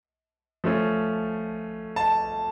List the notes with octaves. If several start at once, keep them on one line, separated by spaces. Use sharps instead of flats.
F3 A3 C#4
A5